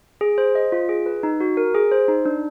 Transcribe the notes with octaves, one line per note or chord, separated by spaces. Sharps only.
G#4
C5
D#5
F4
G#4
B4
D#4
F#4
A#4
G#4
C5
D#4
D4